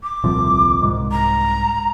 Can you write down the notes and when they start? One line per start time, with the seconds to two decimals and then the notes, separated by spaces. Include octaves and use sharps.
0.03 D6
0.24 D#1 C2 F3
0.82 C2 G#2
1.11 A#5